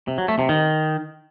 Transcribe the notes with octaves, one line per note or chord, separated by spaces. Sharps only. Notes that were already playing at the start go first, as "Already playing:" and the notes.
C3
F#3
A3
C3
D#3